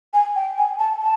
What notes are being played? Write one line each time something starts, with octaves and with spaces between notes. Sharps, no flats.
G#5
G5
G#5
A5
A5